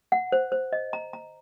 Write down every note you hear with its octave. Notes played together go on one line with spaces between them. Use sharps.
F#5
C5
C5
D#5
A#5
A#5